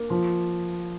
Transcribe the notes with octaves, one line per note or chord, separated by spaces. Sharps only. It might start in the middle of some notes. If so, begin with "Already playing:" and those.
Already playing: A#3
F3